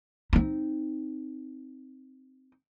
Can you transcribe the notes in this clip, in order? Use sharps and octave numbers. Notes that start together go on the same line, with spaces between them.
C4 D#4